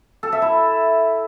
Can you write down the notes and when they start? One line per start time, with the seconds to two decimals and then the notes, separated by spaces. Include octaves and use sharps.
0.23 A4
0.32 E5
0.42 E4